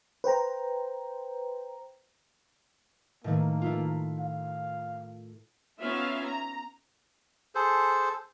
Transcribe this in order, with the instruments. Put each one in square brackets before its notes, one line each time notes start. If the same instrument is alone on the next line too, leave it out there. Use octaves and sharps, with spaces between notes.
[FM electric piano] B4 C5 G5 A#5
[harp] A2 D#3 A3 [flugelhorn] A#3
[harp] A3 E4 F4
[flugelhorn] F5
[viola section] B3 C#4 D#4 F4 E5 F5
A#5
[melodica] G#4 A4 C5